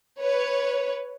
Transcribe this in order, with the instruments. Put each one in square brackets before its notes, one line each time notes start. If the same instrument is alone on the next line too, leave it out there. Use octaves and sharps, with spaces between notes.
[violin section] B4 C#5